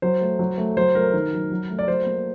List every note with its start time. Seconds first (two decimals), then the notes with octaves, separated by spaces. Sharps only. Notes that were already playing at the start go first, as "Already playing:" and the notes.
0.02 F#3 C5
0.21 A3
0.39 F#3
0.58 A3
0.77 F#3 C5
0.95 A3 A#4
1.13 D#3
1.33 F#3
1.51 F#3
1.69 A3
1.79 D5
1.87 F#3 C5
2.06 A#3